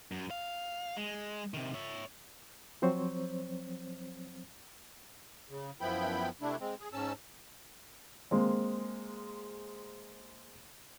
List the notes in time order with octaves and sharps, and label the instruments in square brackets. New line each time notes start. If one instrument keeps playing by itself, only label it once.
[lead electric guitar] F#2
F5
G#3
C3 D#3
C#5 E5
[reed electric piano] F3 F#3 C4 C5 C#5 C#6
[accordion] C#3
F#2 F3 B3 E4 G5 B5
C3 A3 D4 E4
G#3 C4
G#4
G#2 C#4 A5 E6
[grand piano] G#3 A#3 C4